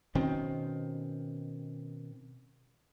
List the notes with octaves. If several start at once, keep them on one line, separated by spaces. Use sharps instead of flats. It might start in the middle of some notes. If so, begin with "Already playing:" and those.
B2 D#3 C4 C#4